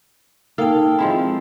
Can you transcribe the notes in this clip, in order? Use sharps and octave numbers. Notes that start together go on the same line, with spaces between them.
A#3 D#4 A4 F5 G5 A5
F3 G#3 C4 E4